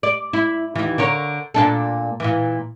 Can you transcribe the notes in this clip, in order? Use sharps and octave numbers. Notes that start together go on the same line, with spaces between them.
D5
E4
D#2 E3
D3 A#4 C#5
A#2 D4 A4
A#2 E3